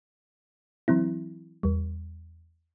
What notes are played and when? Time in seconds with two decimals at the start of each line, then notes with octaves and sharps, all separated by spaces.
0.88 E3 F#3 C4 E4
1.63 E2 G3